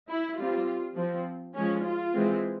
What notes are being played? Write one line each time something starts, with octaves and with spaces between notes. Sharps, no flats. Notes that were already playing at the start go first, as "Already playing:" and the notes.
E4
G3 C4 F4
F3 C4
F3 G#3 C#4
F4
E3 G#3 C4